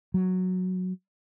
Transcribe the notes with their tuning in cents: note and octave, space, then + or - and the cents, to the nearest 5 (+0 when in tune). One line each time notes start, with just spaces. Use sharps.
F#3 -5